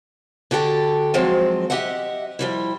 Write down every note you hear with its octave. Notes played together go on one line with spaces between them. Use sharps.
D3 F#4 G4 A4
F3 F#3 G#3 C4
G4 D#5 E5 F#5
F3 G3 E4